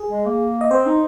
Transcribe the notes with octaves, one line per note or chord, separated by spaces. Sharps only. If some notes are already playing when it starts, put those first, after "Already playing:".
Already playing: G#4
G#3
A#3
D#5
C4 C5
D#4